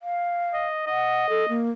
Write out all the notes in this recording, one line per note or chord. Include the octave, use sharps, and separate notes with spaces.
F5
D#5
D#5 F#5
A4
A#3